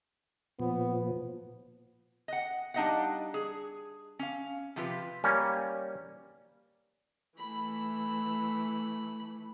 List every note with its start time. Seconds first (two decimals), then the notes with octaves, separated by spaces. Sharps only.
0.60 A#2 F3 B3
2.28 D#5 F#5
2.74 G3 D4 D#4 D#5 F5 F#5
3.34 G#4
4.19 C#4 F5
4.76 C3 F3 F4 G4 B4
5.24 G3 A#3 C#4
7.39 E3 A3 B5